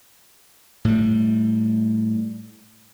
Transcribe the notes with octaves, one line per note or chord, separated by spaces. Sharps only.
A2 G3